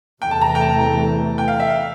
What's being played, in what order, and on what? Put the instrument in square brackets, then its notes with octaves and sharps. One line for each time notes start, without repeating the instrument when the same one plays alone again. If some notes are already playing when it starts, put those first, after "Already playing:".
[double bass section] E2 C3 E3 A3 [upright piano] G5
[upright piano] A5
A#5
G5
A5
G5
F5
E5
F5